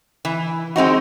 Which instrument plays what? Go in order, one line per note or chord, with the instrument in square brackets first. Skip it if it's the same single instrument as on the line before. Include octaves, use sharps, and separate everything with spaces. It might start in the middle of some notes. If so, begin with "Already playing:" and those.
[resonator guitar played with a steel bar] E3
G#3 C4 D#4 F#4